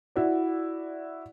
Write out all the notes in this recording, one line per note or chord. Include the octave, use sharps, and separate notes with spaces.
E4 F#4 D5